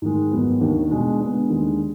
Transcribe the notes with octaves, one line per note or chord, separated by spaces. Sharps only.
G#2 D#3 G#3
G#2 D#3 F#3 B3
D#2 D#3 A#3 D4
B2 G#3 D4
D3 G#3 B3
D#2 D3 G#3